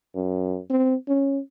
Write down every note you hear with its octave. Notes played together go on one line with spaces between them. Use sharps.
F#2
C4
C#4